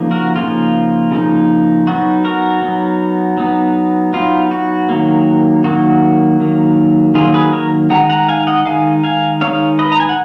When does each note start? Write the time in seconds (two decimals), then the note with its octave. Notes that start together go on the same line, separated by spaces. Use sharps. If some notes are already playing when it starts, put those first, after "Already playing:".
Already playing: C#3 F3 A#3 D#4
0.11 F#4 A#4
0.36 C#3 F3 A#3 D#4 F4
1.11 C#3 F3 A#3 D#4
1.87 F#3 B3 D#4 F#4
2.24 F#4 A#4
2.62 F#3 B3 D#4
3.38 F#3 B3 D#4
4.13 F#3 B3 D#4 F4
4.51 F#4
4.89 D#3 F#3 A#3
5.64 D#3 F#3 A#3 F#4
6.40 D#3 F#3 A#3
7.14 D#3 F#3 A#3 F4 G#4
7.34 G#4 B4
7.53 A#4 C#5
7.90 D#3 G#3 D#4 F#5 A#5
8.10 F#5 A#5
8.28 F5 G#5
8.47 D#5 F#5
8.65 D#3 G#3 D#4 F5 G#5
9.04 F5 G#5
9.41 D#3 G#3 D#4 C#5 F5
9.79 B4 D#5
9.92 A#5
10.00 G#5
10.09 F#5